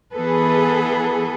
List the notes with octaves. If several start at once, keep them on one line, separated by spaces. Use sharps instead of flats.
E3 B3 G#4 A4 B4